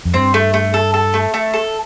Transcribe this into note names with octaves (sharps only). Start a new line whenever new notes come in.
F2
G2 C4
A3
A3
A4
A4
A3
A3
A4